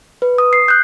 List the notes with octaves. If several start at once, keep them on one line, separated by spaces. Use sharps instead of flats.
B4
D#6
C7
F#6 G6